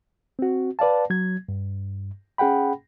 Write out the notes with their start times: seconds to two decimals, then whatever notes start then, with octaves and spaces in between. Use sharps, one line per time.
0.39 C4 F#4
0.79 B4 D5 F5 A5
1.10 F#3 G#6
1.49 G2
2.38 C#4 G#4 F#5 G5 B5